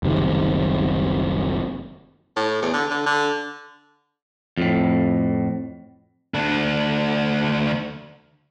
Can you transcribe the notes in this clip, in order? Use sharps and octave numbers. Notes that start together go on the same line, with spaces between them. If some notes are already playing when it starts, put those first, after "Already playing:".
F#1 C2 C3 D#3
A2
E2
D3
D3
D3
F2 A2
D2 D4